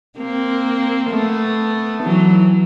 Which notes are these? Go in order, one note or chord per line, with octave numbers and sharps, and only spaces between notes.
A#3 C4
A3 B3
E3 F#3